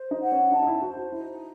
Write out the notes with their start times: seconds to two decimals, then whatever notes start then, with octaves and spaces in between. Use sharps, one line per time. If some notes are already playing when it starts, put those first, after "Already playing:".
Already playing: C5
0.11 D#4
0.21 F#5
0.32 C#4
0.51 D#4 A5
0.62 D#4
0.67 E4
0.81 F#4 C5
0.97 F#4
1.12 D#4 E4